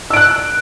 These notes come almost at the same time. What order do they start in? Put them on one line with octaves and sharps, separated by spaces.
E6 D7 F#6